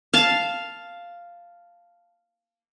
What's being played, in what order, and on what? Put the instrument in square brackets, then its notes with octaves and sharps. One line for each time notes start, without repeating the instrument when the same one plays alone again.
[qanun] F5 A5